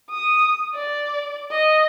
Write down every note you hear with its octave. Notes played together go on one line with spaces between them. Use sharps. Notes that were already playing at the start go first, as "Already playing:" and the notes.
D#6
D5
D#5